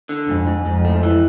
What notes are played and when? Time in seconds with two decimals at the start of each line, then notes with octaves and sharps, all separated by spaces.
0.09 D3
0.28 F2 G#2
0.47 G#2
0.66 F2 G#2
0.85 A3
1.03 E3